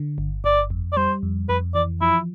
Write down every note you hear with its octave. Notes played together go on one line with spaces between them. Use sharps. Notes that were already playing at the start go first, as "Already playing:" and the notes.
Already playing: D3
G1
G1 D5
F2
D5
G3 C5
F2
F2 B4
E3 D5
F3 E4